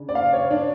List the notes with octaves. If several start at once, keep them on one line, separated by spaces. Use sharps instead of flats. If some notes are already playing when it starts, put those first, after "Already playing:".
Already playing: C#3 D4
D5
F5
C#5
D4